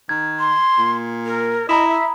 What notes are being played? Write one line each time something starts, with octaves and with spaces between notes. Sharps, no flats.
D#3 G#6
C6
A#2
A#4
E4 D#5 A#5 B5 D#6
E5